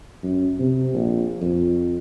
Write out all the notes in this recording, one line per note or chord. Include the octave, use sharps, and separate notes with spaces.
F#2
C3
A#1
F2